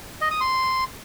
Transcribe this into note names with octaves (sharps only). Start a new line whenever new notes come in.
D#5
D#6
C6